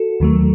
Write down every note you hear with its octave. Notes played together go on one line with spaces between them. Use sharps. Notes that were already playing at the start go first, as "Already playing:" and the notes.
Already playing: F#4 A4
D#2 D#3 F#3 A3